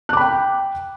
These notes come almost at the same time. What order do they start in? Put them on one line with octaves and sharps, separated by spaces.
F#6 D6 B5 G5